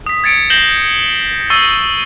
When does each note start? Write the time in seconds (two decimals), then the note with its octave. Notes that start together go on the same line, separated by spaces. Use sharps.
0.06 D#6 B6
0.24 G#6 A6 C#7 D7
0.50 G6 A#6 C7 E7 F#7 G7
1.50 C#6 E6 A6 C7 D#7 G7